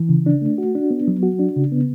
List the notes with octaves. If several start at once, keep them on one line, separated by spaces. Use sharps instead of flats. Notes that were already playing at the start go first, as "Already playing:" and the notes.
Already playing: E3
C#3
D4
A3
F#4
D4
B3
F#3
F#4
D4
C#3
B3